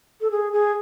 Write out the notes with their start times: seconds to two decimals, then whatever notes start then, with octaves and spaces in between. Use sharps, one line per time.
0.21 A4
0.31 G#4
0.53 G#4